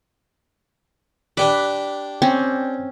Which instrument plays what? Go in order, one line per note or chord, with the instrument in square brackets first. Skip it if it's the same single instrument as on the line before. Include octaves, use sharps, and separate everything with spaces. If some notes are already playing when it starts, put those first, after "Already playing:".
[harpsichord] D4 G4 D5 [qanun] B4
[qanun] C4 C#4